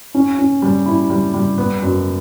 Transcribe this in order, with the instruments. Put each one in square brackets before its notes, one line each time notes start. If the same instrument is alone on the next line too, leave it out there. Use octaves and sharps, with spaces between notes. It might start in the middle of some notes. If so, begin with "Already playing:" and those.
[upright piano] C#4
C#4
G3
E4
G3
G3
B3
F#2